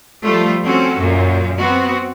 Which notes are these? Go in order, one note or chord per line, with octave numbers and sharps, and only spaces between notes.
F3 G3 A3 F4
C4 C#4 F#4 A4
F#2 A#2
B3 C4 F#4